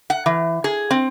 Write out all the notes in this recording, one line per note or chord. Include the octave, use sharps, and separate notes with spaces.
F#5
E3
G#4
C4